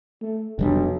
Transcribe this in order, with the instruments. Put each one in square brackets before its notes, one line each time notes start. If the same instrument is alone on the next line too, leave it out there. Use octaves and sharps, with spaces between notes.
[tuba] A3
[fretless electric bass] F1 G3 D4 [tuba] B1